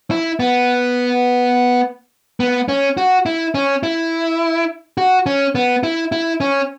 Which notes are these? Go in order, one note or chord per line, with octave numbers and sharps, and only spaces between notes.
E4
B3
B3
C#4
F#4
E4
C#4
E4
F#4
C#4
B3
E4
E4
C#4